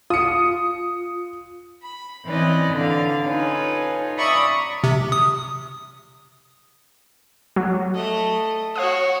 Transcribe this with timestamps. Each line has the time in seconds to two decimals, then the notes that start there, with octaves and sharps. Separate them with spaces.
0.10 F4 D#6 C#7
1.83 B5
2.26 E3 C4 C#4 B4 D5 D#5
2.73 D3 F5
3.23 C#4 D#4 F4 A4 B4 G#5
4.17 D5 E5 A#5 B5 C#6 D#6
4.84 C3
5.12 D#6
7.56 F#3
7.95 A3 D#5
8.76 F#4 C#5 F5 D#6